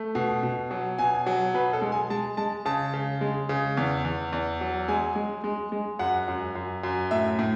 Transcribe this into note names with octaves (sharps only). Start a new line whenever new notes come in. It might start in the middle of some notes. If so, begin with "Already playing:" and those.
Already playing: A3
B2
B2
F#3
B2 G#5
F#3
B2 B4
A4
G#3
G#5
G#3 A5
G#3 A5
C#3 A5
C#3
G#3
C#3
E2
E2
E2
F#3
G#3 G#5
G#3
G#3
G#3
F#2 F#5
F#2
F#2
F#2
A2 E5
A2